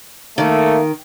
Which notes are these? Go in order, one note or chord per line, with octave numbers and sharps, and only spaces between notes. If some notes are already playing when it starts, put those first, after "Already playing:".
D#3 A3 A#3